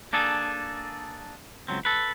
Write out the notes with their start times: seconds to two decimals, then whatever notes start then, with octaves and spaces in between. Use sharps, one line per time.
0.13 A#3 D4 G#4 A4
1.68 C#2 F#3 C4
1.85 A4 B4